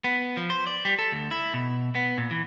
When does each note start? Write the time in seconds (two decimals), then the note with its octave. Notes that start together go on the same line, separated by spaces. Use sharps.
0.04 B3
0.37 F3
0.50 C5
0.67 D5
0.85 G3
0.99 A4
1.12 D2
1.31 E4
1.54 B2
1.95 B3
2.18 A#2
2.31 E3